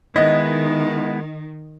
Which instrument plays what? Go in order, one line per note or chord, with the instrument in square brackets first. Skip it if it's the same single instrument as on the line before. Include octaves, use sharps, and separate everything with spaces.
[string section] D#3 [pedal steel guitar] G#3 B3 E4 [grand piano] D#5